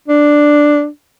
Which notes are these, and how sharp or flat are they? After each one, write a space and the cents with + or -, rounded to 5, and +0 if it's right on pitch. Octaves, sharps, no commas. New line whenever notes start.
D4 +5